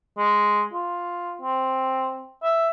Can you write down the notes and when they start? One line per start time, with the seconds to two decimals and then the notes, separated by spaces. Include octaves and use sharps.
0.18 G#3
0.73 F4
1.42 C4
2.43 E5